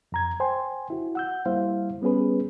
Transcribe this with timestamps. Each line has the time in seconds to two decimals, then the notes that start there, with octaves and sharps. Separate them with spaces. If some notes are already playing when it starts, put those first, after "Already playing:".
0.12 F2 A#5 G#6
0.40 C5 G5 G#5 C6
0.90 E4 F#4
1.15 F#5 E6 G6
1.46 G3 A#3 E4 C5 F5
2.02 G3 B3 C#4 G#4 B4